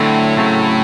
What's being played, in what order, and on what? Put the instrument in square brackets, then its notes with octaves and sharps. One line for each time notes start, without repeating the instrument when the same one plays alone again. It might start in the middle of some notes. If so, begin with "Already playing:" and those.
Already playing: [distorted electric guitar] A2 [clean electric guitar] D3 F#3 A3 C4
[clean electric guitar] C#3 F#3 A3 C4